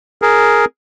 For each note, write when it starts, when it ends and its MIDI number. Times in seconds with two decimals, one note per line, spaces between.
0.22 0.65 68
0.22 0.65 70